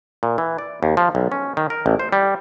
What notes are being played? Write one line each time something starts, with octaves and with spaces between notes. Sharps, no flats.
A#2
E3
D5
D#2
F3
B1
C#4
D#3
A#4
A1
C5
G3